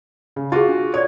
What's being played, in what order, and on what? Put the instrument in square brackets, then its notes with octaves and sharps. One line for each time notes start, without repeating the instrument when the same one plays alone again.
[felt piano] C#3
[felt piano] F4 F#4 [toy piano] G#4 A5
[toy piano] D4
[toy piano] A4 D5 [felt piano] C#5